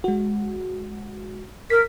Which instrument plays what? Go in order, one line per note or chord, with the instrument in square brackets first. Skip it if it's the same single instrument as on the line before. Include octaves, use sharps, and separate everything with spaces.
[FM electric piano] G#3 F#4
[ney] A#4 [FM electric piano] B6